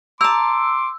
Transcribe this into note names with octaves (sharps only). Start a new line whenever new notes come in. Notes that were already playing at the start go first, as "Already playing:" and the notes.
A5 A#5 C6 D6 E6